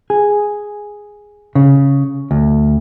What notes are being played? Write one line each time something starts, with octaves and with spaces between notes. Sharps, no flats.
G#4
C#3
D2